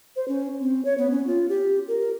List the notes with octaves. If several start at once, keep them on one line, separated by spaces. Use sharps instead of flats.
C5
C#4
C4
C#5
B3
C#4
F4
G4
A#4